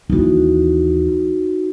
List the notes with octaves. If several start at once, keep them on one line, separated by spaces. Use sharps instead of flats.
D#2 E3 D#4 F#4